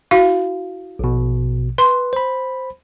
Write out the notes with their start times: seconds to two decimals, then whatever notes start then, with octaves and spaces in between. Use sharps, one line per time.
0.11 E4 F#4 F5
0.99 A#1 B2
1.78 B4 C6
2.13 C5 B5